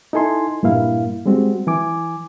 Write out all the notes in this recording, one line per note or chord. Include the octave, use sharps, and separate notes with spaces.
D#4 E4 A4 G#5 C6
G2 A#2 A#3 E4 F5
G3 G#3 C4 F#4
E3 G#5 D6